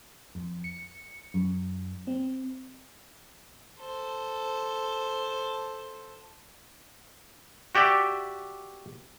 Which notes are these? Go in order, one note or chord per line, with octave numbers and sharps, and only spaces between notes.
F2
C#7
F#2
C4
A4 C5
F#4 G4 D5 E5 G5